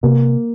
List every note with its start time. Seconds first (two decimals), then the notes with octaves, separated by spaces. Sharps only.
0.03 C3 A#3